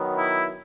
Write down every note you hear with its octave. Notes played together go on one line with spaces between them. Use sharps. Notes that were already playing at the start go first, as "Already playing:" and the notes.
Already playing: D#3 F#3 B3
E4